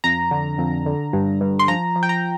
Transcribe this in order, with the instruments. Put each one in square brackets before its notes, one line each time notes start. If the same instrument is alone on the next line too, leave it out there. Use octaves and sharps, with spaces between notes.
[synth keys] F2 A#5
D3
F2
D3
G2
G2
C6
F3 A#5
F3
G5
A#5